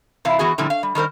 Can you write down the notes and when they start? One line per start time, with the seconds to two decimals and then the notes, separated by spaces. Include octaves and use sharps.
0.25 C3 E3 E4 F5
0.39 E3 B3 F#4 G#4
0.58 A#2 D3 F3 G3 E4
0.70 F5
0.83 G3
0.95 D#3 G3 A#4 C5